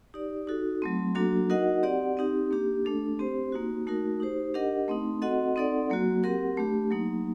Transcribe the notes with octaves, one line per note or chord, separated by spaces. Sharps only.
D#4 G4 D5
D#4 F#4 A4
F#3 A3 C4
F#3 A#3 D4 F#4 A4
D#4 F#4 A#4 D#5 F#5
C4 G4 D5 F#5
C4 D#4 G4
A#3 D4 G4
A3 D4 A4
C4 G4 C5
A#3 D#4 F#4
A3 D#4 F#4 A#4
D#4 G4 C5
D4 G4 A#4 D#5 F#5
A3 C4 D#4
C4 F#4 A4 D#5 F#5
C4 D#4 A4 D5 F#5
F#3 A#3 F#4
C4 G4 A#4 F#5
A3 D4 G4
F#3 A#3 D#4